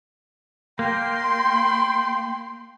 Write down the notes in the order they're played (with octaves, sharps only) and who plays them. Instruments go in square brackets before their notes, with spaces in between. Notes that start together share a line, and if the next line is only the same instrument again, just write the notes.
[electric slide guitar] A#3 [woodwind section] G5 [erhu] C6